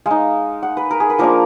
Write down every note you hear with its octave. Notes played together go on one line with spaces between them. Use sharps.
G#3 F5
D#4
F#5
B4
A#4
G#4
B4
F3 A#3 D4 F4 A#4